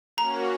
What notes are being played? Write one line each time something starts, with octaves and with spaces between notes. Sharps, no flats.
A#3 C#4 F#4 A#5